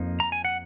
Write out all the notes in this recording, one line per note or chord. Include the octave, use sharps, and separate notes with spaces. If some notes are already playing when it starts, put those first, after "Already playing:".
Already playing: F2 F3 A#3 D#4
A#5
G#5
F#5